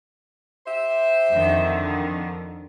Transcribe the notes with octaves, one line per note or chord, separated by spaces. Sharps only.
G4 C5 E5
F2 D3 D#3